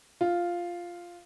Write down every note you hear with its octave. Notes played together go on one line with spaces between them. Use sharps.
F4